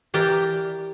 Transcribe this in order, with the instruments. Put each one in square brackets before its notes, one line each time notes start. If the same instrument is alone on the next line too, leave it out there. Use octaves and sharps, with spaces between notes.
[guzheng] E3 G4 A#4 D5